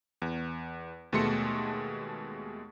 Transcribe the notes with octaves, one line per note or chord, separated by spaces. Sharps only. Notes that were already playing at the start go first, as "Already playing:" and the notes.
E2
D#2 B2 G#3 A3 C6 C#7